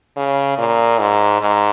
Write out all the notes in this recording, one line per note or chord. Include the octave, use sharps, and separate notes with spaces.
C#3
A#2
G#2
G#2